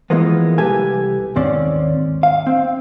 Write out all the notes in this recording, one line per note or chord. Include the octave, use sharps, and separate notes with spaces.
E3 F3 G#3 A#3 B3
C2 G4 A4 B4 G#5
D#2 G#2 C4 C#4 D5
F5
C4